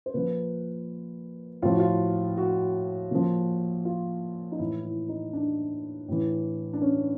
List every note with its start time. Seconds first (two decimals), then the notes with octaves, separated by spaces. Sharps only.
0.06 C5
0.14 A#2 F3 B4
1.62 A2 F3 F4
1.71 F#4
1.80 F4
2.37 F#4
3.11 A#2 F3
3.85 F4
4.52 D#4
4.59 A2 E3 E4
4.84 E4
5.09 D#4
5.33 D4
6.08 A2 E3
6.73 D4
6.82 C#4